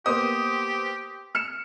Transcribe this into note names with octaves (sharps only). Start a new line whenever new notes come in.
A#3 B3 G4 C5 D#6
F6 C#7 E7